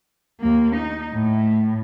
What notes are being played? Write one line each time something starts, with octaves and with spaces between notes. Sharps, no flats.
D#2 A#3
D#4
A2